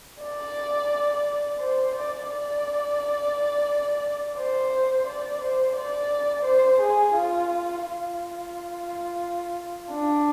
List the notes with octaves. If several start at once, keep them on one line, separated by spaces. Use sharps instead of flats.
D5
C5
D5
D5
C5
D5
C5
D5
C5
G#4
F4
F4
D4